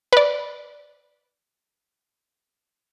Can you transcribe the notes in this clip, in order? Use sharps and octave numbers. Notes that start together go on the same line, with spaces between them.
B4 D5